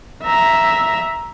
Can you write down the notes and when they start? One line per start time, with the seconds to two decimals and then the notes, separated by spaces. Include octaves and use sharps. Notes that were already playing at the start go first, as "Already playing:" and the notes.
0.24 E5 A#5